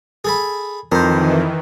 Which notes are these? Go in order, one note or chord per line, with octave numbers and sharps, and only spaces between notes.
G#4 A4 B5
F2 D#3 E3 A#4 C5